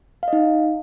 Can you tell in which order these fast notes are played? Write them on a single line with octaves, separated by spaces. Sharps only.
F5 D#5 D#4